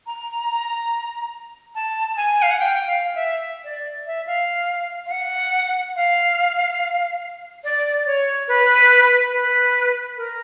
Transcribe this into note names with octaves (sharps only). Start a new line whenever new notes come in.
A#5
A5
G#5
F5
F#5
G5
F5
E5
D5
E5
F5
F5
F#5
F5
D5
C#5
B4
B4
A#4